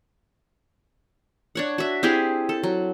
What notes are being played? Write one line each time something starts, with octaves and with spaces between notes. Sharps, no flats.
D4 C#5 F#5
F#4 E5
C4 E4 G4 G#4
A4
F#3